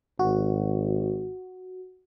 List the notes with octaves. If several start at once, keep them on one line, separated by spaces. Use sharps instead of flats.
G#1 F#4